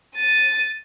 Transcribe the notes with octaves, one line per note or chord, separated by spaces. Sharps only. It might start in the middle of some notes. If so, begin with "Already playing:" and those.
A6 D#7